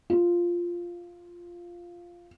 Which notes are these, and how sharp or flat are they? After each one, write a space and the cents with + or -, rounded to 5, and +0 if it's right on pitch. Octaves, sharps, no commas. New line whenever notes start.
F4 -5